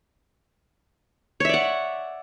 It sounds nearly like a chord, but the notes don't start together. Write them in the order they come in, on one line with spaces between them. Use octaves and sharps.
C#5 E5 D5 F#5